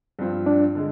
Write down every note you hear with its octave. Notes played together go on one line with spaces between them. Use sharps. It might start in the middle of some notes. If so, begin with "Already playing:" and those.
G2 F3 C4 F4
D4
D3 G#3